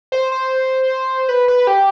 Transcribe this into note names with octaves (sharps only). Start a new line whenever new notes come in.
C5
C5
B4
B4
G4